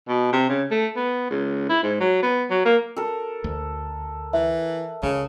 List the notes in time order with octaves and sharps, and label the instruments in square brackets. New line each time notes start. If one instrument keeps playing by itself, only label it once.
[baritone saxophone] B2
C3
C#3
A3
B3
C#2
E4
G#2
F#3
B3
F#3
A#3
[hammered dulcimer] A4 A#4
[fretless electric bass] D2
[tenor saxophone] E3 [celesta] E5
[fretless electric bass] C#2 [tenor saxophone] C#3